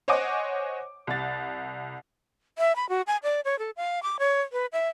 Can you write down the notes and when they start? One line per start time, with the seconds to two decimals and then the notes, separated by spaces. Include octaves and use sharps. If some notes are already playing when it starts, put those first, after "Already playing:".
0.08 C5 C#5 D#5 F#5 G#5 D6
1.07 C2 A6
2.58 E5
2.76 B5
2.89 F#4
3.07 G#5
3.23 D5
3.45 C#5
3.59 A4
3.77 F5
4.03 D6
4.19 C#5
4.52 B4
4.73 E5